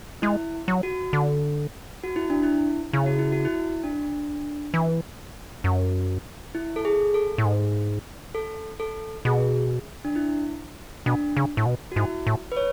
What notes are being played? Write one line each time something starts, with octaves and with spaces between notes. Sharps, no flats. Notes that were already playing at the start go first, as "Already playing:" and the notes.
G#3 E4
F#3
F#4
D3
F#4
E4
D4
E4
C#3 E4
F#4
E4
F#4
E4
D4
E3
F#2
E4
A4
G#4
A4
A2
G#2
A4
A4
B2 G#4
D4
E4
B2 D4
C#3
A2
B2
F#4
G#2 E4
A2
B4
C#5